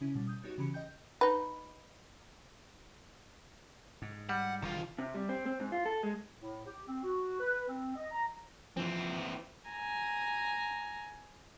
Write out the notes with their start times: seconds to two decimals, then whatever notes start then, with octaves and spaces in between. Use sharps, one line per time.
0.01 C#3 C#4 E4
0.15 B2 G3
0.27 D#6 G6
0.44 B3 D#4 F#4 G4 C#5
0.58 C#3 E3 C#4 G4 B5 C#7
0.74 D#5 G5 G6
1.21 D#4 B4
4.02 G#2
4.29 G3 F#5
4.62 E1 D3 D#3 F4
4.98 C3
5.14 G3
5.29 C4
5.46 C4
5.60 G#2
5.72 F4
5.86 A4
6.03 G#3
6.40 A2
6.65 G4
6.87 C4
7.03 F#4
7.40 B4
7.68 C4
7.96 D#5
8.12 A#5
8.77 E3 F3 C4
9.70 G#5 A#5